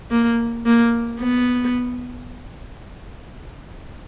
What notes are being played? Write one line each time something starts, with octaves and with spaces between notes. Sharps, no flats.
A#3
A#3
B3